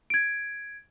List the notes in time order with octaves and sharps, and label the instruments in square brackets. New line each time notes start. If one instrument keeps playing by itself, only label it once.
[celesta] G#6 D7